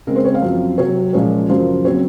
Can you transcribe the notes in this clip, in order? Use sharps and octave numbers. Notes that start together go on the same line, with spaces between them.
C#3 G#3 C4 A#4
C5
C#5
F5
F#2 F3 C4
C3 F#3 C4 C#5
A#2 F3 G#3 C#4 C#5
F#2 C#3 F3 A#3 C5
C#3 F#3 C4 C#5